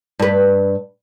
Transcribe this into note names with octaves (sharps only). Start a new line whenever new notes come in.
G2 B4